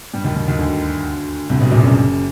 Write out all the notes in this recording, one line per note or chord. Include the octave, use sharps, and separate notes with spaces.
G2 G3
D#2 D#3
D#2 D#3
D#2 D#3
D2 D3
C2 C3
B1 B2
A#1 A#2
F#1 F#2